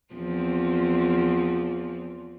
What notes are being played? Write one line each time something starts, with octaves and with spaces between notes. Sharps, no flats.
E2 F3 C4